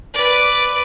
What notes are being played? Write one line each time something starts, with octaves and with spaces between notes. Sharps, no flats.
B4 D5